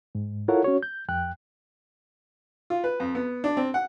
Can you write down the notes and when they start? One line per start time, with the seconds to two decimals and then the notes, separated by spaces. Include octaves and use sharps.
0.15 G#2
0.48 E4 F4 A4 A#4 C#5 F#5
0.64 C#4 F#4 C#5
0.83 G6
1.09 F2 G5 F#6
2.70 F4
2.84 B4
3.00 F2
3.15 B3
3.44 D4
3.57 C4
3.74 F#5